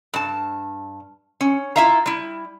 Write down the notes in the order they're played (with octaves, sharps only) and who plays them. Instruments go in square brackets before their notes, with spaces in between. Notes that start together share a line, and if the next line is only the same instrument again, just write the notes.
[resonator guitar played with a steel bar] G2 A5
C#4
E4 F4 E5 F5 A#5
G3 E4